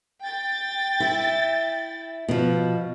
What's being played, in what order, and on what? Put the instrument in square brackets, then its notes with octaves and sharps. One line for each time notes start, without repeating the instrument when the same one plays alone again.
[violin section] G5 A6
[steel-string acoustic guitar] E4 E5
[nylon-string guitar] B2 F3